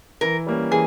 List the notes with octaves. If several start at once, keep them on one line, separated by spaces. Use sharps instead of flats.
E3 A#4
G3 A#3 C#4
E3 G#4